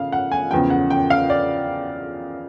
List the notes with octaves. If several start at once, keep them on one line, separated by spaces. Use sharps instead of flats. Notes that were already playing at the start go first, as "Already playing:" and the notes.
Already playing: C#3 F5
F#5
G#5
E2 C#3 F3 G5
F#5
G5
F5
D5